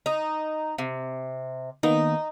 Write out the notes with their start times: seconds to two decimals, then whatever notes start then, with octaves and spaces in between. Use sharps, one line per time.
0.06 D#4
0.78 C3
1.83 D#3 A#3 B3 D#4